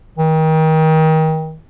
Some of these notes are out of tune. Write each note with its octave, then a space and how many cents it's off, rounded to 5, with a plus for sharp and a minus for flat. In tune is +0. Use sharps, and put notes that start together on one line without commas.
D#3 +30